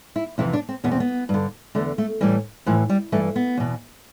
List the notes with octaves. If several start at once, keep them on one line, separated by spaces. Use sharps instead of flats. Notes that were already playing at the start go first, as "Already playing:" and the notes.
E4
F2 C3 E3 E4
D4
C4
E2 B2 B3
C4
B3
G2 D3
E2 D3 A3
A3
A2 E3 G3
A2 E3 F3
G3
G2 E3 A3
B3
E2 B2